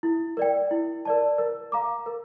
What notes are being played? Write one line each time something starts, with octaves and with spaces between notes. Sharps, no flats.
E4
A#4 D5 G5
E4
A#4 D5 A5
A#4
F5 A#5 D6
A#4